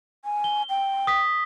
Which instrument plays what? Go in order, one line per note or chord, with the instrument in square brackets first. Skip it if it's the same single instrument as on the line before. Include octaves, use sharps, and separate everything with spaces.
[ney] G#5
[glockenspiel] G7
[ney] G5
[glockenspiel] D#6 B6